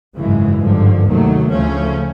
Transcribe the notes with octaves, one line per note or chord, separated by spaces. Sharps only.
G#1 F#2 C#3 E3 G#3
G#1 G2 D3 F3
F1 D#2 D#3 F#3 A3
D2 C#3 F3 A3 C#4